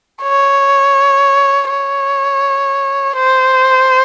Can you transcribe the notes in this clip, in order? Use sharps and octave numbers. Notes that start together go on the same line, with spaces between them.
C#5
C#5
C5